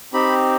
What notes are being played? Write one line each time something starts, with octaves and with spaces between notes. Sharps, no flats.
C4 D#4 G4 B5